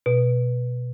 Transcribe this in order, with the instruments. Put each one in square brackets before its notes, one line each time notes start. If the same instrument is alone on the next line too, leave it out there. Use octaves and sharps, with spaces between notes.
[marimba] B2